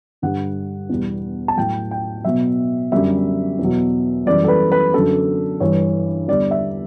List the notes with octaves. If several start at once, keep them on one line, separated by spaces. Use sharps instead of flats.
G2 D3 G3 F#5
E2 B2 G3
A5
A2 F#3 G5
G5
B2 F#3 E5
F#2 D3 G3 E5
E2 B2 F#3
F#2 E3 G3 D5
A4
B4
B4
F#2 D3 F#3 A4
G2 E3 G3 C#5
E2 D3 G3 D5
E5